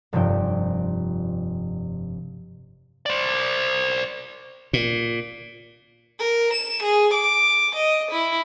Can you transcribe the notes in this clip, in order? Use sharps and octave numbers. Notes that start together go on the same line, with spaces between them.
F1 G2 C3 F3 G5
C5 D5
A#2
A#4
E7
G#4
D6
D#5
E4